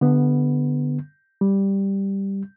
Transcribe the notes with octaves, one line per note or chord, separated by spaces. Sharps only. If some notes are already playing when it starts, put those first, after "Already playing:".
D3 B3
G3